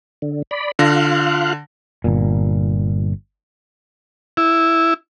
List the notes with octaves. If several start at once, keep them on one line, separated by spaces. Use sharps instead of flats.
D3
D5 B5
D3 F4 F5 F#6 A#6
G1 A#2
E4